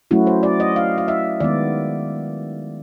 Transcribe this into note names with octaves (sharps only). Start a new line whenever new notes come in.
F#3 A3 C#4 E4 F#4
C5
D5
D#5
F5
F5
E5
D#3 G#3 B3 D5